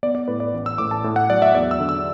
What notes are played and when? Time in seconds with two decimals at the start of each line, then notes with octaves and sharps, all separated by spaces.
0.03 B3 D5
0.15 D5
0.28 A2 B4
0.40 D5
0.54 A1
0.66 E6
0.78 A2 D6
0.91 A5
1.04 A2
1.16 F#5
1.30 F#3 D5
1.42 E5
1.55 E2 D5
1.71 E6
1.80 D3
1.89 E6